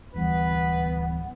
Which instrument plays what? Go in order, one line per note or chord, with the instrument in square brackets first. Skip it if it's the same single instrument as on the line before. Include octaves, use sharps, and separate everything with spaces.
[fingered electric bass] D1 E3 G3 [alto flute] B3 [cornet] B4